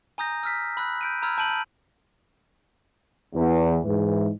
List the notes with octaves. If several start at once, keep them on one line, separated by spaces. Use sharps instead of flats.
G#5 A#5 D#6 G6 A#6
E6 F6 B6
B5 E6 F#6
G6 D7 D#7
A#5 B5 E6 F6 G#6
A5 G6 D7 D#7 F#7
E2
G#2 E3